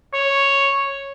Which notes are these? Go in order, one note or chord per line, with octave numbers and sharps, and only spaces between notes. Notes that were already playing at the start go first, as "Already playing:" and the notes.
C#5